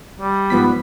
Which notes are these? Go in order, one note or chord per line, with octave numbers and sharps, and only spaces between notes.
G3
G#2 F3 B3 B6